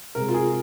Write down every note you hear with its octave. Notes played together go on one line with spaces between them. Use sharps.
C3 G#3 A#4
F4
G#4